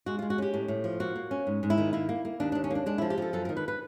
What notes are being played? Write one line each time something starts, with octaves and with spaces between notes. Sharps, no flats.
G#3 F#4
G#3 F4
F#4
C#4 G4
A2
A2
F3
A#3 F#4
A#3
C#4
G#2
G#2
E4
D#3
A#3 E4
A#3
A#3
D#2 D4
D#2 D4
C#4
A#3 D4
G#3 D4
F3 E4
G4
F3 A4
F#2 A4
D#3 A#4
B4
B4